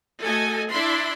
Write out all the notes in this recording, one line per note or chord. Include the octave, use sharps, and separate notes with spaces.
A3 F#4 A4 D#5 G#5
D4 E4 E5 B5 C6